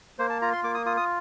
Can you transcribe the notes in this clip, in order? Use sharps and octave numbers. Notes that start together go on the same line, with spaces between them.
A#3 C5
A5
F4 A#5
C6
A#3 D6
D#6
F4 D#6
D#6